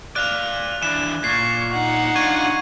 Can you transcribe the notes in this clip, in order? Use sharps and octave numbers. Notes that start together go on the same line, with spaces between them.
D5 F5 F#6 F7
E3 D4 E7
A#2 C#6 C7
D#4 F#5
D4 F4 C#6 G#6 D#7